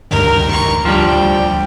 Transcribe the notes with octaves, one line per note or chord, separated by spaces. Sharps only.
D2 G2 D#3 A#4
C#6
D2 F3 G3 G5